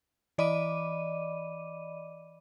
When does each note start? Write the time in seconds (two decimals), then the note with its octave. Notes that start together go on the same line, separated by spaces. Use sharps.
0.38 E3 D5 D#5 B5 D6 D#7